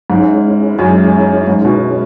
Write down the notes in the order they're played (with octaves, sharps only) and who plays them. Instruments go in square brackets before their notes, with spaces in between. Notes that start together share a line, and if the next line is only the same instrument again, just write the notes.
[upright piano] G#2 [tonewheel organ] G#3 C#4 E4
[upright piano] F#2 [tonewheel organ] G#3 C#4 E4
[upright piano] G#2 [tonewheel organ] G#3 C#4 E4
[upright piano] B2